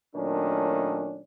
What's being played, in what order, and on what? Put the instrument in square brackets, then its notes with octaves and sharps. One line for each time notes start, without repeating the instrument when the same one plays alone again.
[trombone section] A#2 D#3 F#3 A3 C#4 D4